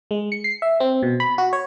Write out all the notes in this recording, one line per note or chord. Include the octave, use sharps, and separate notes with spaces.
G#3
C#7
C7
E5
C4
B2
B5
F#4
C#5